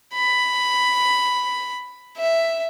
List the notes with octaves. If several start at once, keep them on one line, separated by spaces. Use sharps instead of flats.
B5
E5